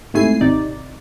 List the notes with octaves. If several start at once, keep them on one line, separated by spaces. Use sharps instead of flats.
G#2 C3 A3 E4 G#5 C7
G#1 C3 D#4 D5